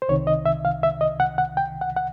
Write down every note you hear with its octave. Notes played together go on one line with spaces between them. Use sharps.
C5
C2 C3 D#3 C#5
D#5
E5
F5
E5
D#5
F#5
F#5
G5
F#5
F#5